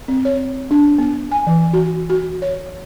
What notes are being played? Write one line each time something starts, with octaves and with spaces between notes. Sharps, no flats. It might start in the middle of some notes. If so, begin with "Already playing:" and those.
C4
C#5
D4
B3
G#5
E3
F#4
F#4
C#5